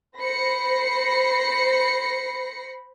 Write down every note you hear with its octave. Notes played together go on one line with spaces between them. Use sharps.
C5 B5 A#6 C7 C#7